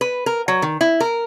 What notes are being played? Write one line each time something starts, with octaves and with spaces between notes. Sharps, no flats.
B4
A#4
F#3
D#3
E4
A#4